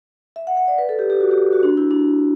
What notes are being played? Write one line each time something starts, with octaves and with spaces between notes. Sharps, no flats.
E5
F#5
F#5
D5
B4
A4
G4
G4
F#4
G4
F#4
D4
E4
D4